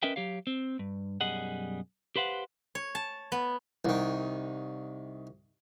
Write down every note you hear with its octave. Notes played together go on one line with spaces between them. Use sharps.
C#4 A#4 B4 D#5 E5 G5
F#3 G4 C#5 F5
C4
G2
B1 F#2 G3 G#4 D#5 F#5
G4 B4 C5 F5 F#5
C#5
A5
B3
C2 D#3